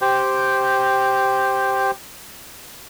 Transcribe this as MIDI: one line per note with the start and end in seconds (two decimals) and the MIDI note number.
0.02 1.91 67
0.02 1.91 72
0.02 1.91 79